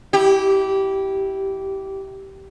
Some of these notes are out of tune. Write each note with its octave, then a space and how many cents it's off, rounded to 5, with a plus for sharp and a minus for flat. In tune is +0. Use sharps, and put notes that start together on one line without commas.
E4 -15 G4 -15